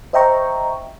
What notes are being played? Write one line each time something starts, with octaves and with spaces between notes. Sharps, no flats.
C5 D#5 E5 G5 A#5 C#6